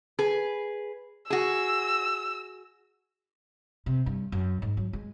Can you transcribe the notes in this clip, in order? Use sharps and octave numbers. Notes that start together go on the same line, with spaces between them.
G#4 B4
F#4 G#4 E6
C3
G2
F#2
G#2
F#3
G#3